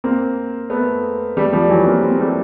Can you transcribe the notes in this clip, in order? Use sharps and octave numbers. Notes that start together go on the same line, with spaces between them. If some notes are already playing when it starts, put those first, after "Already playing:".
A#3 C4
A3 B3
G3 A3
F3 G3
E3 F#3
A#3 C4
A#3 C4
G3 A3